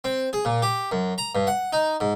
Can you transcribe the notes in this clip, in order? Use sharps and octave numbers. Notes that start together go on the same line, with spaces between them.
C4
G#4
A#2
G4
F#2
A#5
G2
F#5
D#4
G#2